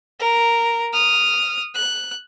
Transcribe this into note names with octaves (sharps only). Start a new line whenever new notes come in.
A#4
D#6 F6
F#6